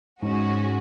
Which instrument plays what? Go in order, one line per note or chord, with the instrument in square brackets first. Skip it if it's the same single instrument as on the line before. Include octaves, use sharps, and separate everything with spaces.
[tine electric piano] G#2 [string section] G#3 C#4 F#4